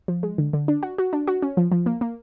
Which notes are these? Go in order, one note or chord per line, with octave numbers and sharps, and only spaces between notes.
F3
G#3
D3
D3
D4
F#4
F#4
D4
F#4
C#4
F3
F3
A#3
A#3